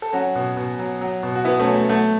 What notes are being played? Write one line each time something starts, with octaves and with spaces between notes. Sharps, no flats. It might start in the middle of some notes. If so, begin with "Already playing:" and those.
A4
F#3 C#4 F#4
B2
B2
F#3
F#3
B2
F#4
B2 B3 E4
A3 C#4
F#3
A3
F#3 A3